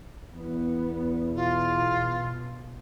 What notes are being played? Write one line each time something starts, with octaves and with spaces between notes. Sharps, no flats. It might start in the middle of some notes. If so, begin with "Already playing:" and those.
E2 B3
B2 F4